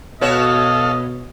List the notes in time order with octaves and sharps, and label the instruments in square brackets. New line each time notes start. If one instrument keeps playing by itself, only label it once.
[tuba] B2 [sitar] B3 F#4 C#5 [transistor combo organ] A4 F5 [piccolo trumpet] D#5